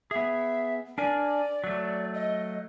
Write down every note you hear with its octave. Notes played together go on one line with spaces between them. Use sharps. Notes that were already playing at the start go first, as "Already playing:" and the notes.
B3 G#4 E5
D4 A#4 D5 G#5
F#3 A3
D#5